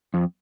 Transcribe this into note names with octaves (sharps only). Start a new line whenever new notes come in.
F2